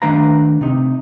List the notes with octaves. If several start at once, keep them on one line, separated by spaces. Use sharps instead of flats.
D#3 A3 D4 B4 F5 A#5
C3 D#4